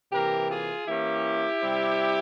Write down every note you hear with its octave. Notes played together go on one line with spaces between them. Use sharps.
C3 E3 A#3 G4 A#4
F4 G#4
E3 A#3 C#4 E4 G4
C3 G3 C4